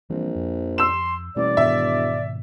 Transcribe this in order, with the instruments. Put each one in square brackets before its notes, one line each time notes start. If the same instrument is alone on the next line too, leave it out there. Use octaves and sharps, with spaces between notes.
[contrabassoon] A#1 [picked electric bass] E3 G3 C4
[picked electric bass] F2
[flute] C6 [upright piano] E6 E7
[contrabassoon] A1 [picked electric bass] B2 G3 A#3 [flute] D5
[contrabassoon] E1 [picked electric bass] G#2 B2 D#3 [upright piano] E5